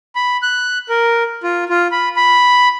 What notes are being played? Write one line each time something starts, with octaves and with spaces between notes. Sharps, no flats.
B5
F#6
A#4
F4
F4
B5
B5